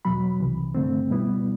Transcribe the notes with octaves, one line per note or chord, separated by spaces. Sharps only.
E2 B2 F#3 B5
C2 C3 E3
G2 D3 A3 C4
B2 G3 B3 E4